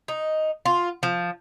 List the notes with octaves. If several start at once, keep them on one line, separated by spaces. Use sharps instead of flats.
D#4
F4
F3